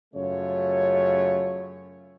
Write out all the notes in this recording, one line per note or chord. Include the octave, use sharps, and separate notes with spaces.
F#2 C#3 A3 F4 C#5